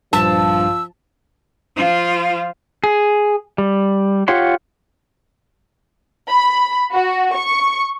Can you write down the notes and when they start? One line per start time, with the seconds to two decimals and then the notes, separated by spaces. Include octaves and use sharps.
0.13 A#1 G2 F3 A5 E6
1.76 F3 F4
2.84 G#4
3.58 G3
4.28 F4 G4 C#5 F#5 C6
6.29 B5
6.93 F#4
7.37 C#6